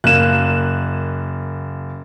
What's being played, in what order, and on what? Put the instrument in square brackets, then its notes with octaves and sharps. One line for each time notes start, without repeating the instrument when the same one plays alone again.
[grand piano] F#1 A#3 [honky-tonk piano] F#6 E7